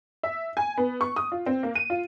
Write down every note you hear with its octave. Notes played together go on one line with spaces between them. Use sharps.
E5
G#5
B3
C#6
D#6
F4
C4
A#3
D#7
F4